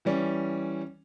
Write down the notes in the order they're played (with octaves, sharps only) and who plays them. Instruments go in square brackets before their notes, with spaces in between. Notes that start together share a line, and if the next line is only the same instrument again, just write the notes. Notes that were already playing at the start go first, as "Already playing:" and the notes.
[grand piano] E3 G3 C#4